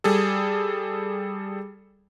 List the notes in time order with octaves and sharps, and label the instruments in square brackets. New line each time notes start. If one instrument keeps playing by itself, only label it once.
[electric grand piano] G3 G#4 A4